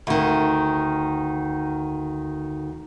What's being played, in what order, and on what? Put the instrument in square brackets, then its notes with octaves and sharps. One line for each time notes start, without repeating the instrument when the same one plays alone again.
[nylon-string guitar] D2 D#3